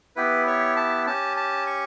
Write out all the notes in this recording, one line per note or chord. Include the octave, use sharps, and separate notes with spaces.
B3 E4 G4 B4
C#5
A5
C#4 G4 A5
A5
C#6